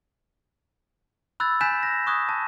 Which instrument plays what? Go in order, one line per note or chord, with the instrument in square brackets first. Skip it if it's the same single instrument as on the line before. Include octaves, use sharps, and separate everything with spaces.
[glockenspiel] B5 E6 F#6 G#6 A6
G#5 F#6 G6 A6 B6 E7
A#6
C#6 D#6 F#6 G#6
A5